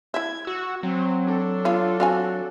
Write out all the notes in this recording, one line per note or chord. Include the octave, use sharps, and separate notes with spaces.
E4 E5 G#6
F#4 E6
F#3 C4 C5
D4 A4
B3 F4 C#5 F5
C4 F#4 F5 G#5